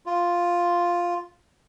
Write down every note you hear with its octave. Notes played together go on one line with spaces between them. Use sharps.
F4